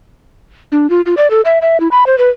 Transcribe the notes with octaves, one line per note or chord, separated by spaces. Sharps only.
D4
F4
F4
D5
A4
E5
E5
E4
B5
C5
B4